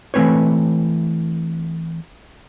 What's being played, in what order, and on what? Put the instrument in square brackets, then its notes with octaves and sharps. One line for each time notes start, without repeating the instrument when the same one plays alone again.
[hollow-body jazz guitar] E3 A3 A#3 C4 B4 C#5